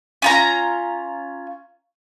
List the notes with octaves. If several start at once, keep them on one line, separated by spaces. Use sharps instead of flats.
C#4 F4 A#5